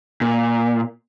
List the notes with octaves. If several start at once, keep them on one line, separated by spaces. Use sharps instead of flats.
A#2